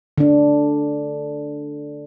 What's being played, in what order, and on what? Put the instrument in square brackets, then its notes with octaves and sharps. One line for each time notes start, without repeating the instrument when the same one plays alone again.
[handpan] D3 D4